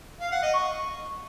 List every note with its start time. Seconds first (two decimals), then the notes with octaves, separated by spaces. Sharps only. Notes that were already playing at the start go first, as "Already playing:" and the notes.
0.20 F5
0.31 F#5
0.42 D#5
0.53 C#6